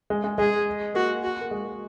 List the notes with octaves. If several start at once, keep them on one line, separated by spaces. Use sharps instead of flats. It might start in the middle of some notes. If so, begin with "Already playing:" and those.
G#3
G#3
G#3 G#4
A#3 F#4
F#4
A#3
G#3